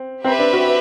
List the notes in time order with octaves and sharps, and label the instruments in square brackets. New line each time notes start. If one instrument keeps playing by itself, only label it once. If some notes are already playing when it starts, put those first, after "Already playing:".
Already playing: [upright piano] C4
[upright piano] C4 [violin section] G4 B4 E5
[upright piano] D4
F#4